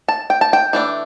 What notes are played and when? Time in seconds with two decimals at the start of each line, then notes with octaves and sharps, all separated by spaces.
0.08 A5
0.30 G5
0.41 A5
0.53 G5
0.73 E3 A3 D4